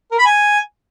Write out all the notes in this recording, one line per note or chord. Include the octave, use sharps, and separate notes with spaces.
A#4
B5
G#5